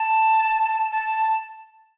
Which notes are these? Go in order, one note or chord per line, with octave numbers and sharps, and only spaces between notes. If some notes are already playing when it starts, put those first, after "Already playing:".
Already playing: A5
A5